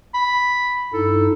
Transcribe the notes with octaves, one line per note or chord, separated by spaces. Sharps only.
B5
G2 D#4 E4 A4